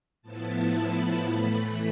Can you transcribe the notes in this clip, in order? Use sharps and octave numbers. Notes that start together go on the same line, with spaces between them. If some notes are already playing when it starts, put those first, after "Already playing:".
A2 F3 B3 E4 A5
B5
A2 E3 A3